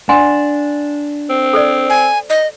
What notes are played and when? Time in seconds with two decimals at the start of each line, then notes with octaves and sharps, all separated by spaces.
0.09 D4 F#5 G#5 C6
1.29 C4
1.53 A4 C5 D5
1.90 G#5
2.30 D#5